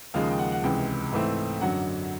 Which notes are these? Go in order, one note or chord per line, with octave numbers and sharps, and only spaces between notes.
D#2 C#3 F3 G#3 F5
G5
F#5
F#5
C#2 C3 E3 G#3 G5
G#2 E3 A3 C4
F#2 D3 F#3 F#5